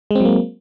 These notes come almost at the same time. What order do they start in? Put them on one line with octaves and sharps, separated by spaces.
G#3 C4 F#3 A#3